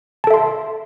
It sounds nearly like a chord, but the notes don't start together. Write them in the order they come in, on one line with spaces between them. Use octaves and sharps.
A5 A4 E5 C6